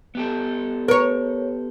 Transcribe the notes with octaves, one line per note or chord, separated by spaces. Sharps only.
B3 G4 A4
A#4 B4 C#5